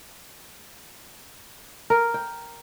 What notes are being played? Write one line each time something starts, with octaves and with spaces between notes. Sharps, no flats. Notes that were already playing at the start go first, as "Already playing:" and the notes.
A#4
G5